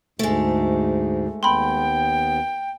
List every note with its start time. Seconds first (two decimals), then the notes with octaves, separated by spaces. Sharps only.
0.19 D2 G#2 G#3 A3
1.43 D#2 B3 G5 B5 C6